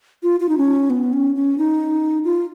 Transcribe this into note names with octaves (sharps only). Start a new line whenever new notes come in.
F4
F4
D#4
C#4
B3
C#4
C#4
D#4
F4